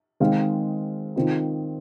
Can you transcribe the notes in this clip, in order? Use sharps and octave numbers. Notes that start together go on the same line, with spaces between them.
D#3 G#3 C4 G#4 F5
D#3 C4 F4